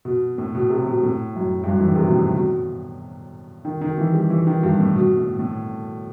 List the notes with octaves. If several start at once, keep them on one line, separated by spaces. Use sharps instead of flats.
B2
A2
B2
C3
B2
A2
F#2
G2
F#2
E3
D#3
C3
B2
A2
B2
D#3
D#3
E3
G3
E3
D#3
G2
A2
B2
A2
A2